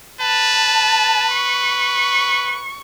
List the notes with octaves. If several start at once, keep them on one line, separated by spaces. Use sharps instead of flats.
B4 A5
C#6